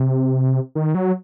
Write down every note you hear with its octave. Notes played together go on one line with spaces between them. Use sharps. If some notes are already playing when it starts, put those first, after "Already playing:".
Already playing: C3
D#3
F#3